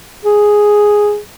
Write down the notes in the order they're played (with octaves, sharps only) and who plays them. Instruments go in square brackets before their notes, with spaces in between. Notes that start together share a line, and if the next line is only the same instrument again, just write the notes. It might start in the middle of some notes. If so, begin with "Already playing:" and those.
[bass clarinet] G#4